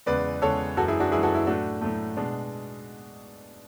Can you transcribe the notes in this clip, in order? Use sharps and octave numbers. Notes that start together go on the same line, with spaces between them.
E2 C#3 G#3 B4 D5
E2 C#3 G#3 A4 C#5
F#2 E3 G#3 F#4 A4
E4 G#4
D4 F#4
F#2 E3 G#3 E4 G#4
F#4 A4
E4
A2 F#3 A3 D4 F#4
A2 F#3 A3
B2 G#3 D4